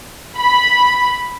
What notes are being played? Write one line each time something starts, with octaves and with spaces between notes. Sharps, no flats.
B5